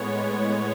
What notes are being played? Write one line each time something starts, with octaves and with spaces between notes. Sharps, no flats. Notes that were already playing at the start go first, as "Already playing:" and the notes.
Already playing: A2 G#3 B3 C#5